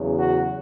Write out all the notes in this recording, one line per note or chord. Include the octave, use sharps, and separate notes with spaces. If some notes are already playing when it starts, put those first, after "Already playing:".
Already playing: E2 C#3 F#3
F#4